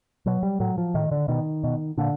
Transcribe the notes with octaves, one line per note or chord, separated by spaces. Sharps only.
B2 F#3
G3
A2 F#3
F3
A2 D#3
D3
B2 D#3
B2
A#2 D3